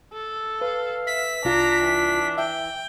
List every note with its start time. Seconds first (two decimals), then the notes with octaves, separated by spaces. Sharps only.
0.13 A4
0.61 B4 F5
1.07 E5 B6
1.45 C2 D4 F4 A#5
1.84 E3
2.38 E5 G5